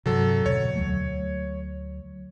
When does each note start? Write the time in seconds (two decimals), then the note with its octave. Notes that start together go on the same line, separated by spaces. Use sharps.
0.06 G2 C3 F#3 A4
0.46 E2 B2 D3 C#5
0.75 D2 F#3 A3